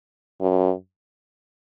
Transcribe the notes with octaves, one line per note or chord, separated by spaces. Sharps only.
F#2